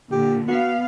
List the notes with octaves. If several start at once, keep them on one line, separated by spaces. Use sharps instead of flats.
A#2 D3 G4
B3 F#4 F5